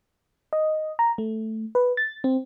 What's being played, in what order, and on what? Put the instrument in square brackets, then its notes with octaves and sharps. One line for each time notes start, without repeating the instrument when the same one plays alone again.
[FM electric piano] D#5
A#5
A3
B4
A6
C4